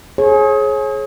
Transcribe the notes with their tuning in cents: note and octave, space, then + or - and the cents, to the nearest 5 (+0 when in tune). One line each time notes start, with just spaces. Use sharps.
G#4 +25 C#5 -35